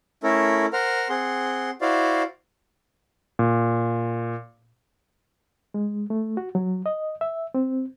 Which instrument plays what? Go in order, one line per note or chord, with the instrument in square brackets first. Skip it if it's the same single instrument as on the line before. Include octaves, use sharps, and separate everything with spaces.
[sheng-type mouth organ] A3 C#4 E4 A4 A#4
A#4 C5 F#5 F6
C4 G#4 F#5 C6
E4 F#4 C5 D5 F5
[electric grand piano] A#2
[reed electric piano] G#3
A3
F#4
F#3
D#5
E5
C4